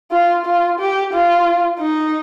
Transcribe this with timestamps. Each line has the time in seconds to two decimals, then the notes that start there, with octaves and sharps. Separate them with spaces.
0.11 F4
0.46 F4
0.80 G4
1.13 F4
1.80 D#4